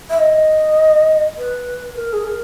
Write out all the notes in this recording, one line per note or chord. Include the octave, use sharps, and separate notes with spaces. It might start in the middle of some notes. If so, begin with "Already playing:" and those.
E5
D#5
B4
A#4
G#4
A#4